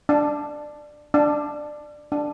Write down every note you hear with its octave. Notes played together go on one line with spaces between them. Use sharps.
D4
D4
D4